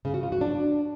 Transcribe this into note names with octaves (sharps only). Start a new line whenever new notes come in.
C#3
F#4
F4
F#4
D4